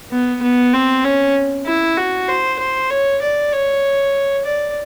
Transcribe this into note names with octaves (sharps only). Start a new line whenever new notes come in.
B3
B3
C4
C#4
E4
F#4
C5
C5
C#5
D5
C#5
D5